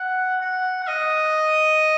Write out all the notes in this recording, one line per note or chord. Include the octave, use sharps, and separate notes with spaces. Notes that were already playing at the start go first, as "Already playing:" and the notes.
Already playing: F#5
F#5
F#5
D#5